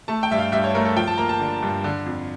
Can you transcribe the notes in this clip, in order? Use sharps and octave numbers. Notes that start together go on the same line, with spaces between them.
A3 A5
G5
G2 E5
F5
G2 E5
C#5
A3 A#4
A4
F3 G5
A5
A#3 A#5
A5
D3
G2
D3
F2